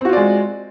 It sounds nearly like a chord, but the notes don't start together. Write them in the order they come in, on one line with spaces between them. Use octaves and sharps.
C4 F#4 F4 D5 G#3